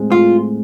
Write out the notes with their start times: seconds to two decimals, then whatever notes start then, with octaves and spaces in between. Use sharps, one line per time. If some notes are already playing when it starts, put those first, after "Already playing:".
Already playing: A2 G#3 C4
0.11 A2 F4